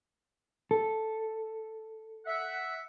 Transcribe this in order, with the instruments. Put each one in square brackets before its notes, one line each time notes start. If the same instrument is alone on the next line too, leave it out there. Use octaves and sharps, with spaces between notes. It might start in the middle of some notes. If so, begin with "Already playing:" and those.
[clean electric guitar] A4
[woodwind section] E5 F#5